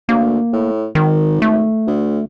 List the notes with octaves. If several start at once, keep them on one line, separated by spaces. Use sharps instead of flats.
D2 A#3
A2
G#1 D#3
A3
D2